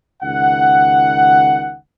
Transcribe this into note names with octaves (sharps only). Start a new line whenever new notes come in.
C#2 D#3 F#5